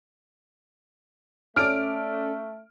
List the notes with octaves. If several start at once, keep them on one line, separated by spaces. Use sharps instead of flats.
A3 C#4 A4 D5 F6 D7